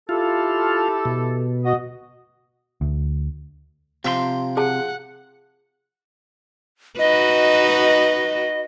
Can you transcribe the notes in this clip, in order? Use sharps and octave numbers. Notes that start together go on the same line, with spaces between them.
E4 F4 G4 A4
B2
F#4 D#5
D2
C3 F3 E5 G5 C6
G#4 F#5 A5
D#4 F#4 B4 D#5